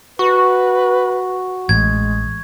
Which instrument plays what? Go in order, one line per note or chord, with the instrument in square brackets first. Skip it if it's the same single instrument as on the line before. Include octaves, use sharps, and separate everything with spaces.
[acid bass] F#4 [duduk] B4 [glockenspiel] C#6
[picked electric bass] A1 [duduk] G#3 [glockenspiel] G#6